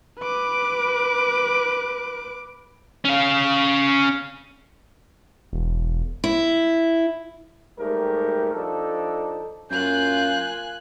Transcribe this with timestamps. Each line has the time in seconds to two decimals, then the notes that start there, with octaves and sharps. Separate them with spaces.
0.19 B4 D6
3.05 C#4 F5
5.53 E1
6.24 E4
7.79 G#2 G3 A3 G4 A#4
8.54 F3 D4 D#4 A4
9.70 F#2 A#3 F4 G#5 F#6 G6